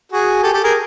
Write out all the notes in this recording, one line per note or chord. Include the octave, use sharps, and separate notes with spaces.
F#4 G#4
G4 A4
G4 A4
G#4 A#4